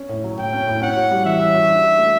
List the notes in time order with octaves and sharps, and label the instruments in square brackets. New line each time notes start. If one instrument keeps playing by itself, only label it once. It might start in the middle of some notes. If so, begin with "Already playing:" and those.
Already playing: [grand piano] C#4
A2
F#3
[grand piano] A2 [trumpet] G5
[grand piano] C#4
A2
[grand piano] C#4 [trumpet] F#5
[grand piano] F#4
G3
[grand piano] E3 [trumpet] E5
[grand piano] C#4
F#4
D4
F#4
A3